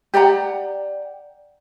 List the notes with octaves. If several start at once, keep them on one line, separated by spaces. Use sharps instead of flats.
G4 D5 F#5 A#5